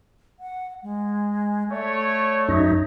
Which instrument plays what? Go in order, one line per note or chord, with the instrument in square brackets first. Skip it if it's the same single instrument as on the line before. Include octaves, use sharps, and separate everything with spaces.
[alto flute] F#5
G#3
[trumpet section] A3 C#5 [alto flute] D5
[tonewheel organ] F#2 D#4 [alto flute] E5